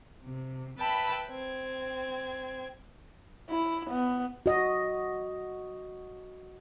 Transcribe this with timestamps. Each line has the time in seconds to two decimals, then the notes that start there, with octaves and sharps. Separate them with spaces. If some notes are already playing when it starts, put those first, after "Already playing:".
0.23 C3
0.78 B4 E5 G5 A5 B5
1.29 C4 G#6
3.50 E4
3.90 B3
4.46 F#4 D#5